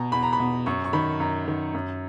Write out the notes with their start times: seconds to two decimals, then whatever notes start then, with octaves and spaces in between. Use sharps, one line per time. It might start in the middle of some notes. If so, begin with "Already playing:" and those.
Already playing: B2 A#5
0.12 E2 B5
0.23 A#5
0.33 B5
0.40 B2
0.66 F#2 C#6
0.84 C#6
0.93 D#3 B5
1.20 F#2 A#5
1.48 D#3
1.74 F#2